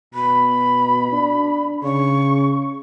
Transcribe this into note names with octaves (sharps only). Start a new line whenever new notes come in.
B2 B5
D4
C#3 C#6